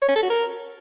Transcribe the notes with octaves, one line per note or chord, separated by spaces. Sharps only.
C#5
C#4
A4
F#4
A#4